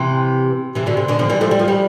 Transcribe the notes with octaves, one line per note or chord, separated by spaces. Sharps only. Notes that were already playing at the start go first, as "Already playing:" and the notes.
Already playing: C3 E3
C3 E3
B2 D3
C3
B2 D3
D3 F3
E3 G3
F3 A3
G3
F3
E3 G3